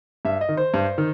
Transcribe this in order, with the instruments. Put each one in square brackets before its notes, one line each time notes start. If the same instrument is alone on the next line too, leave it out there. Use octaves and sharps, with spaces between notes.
[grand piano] G2 E5
D#5
D#3
C5
G2
D#3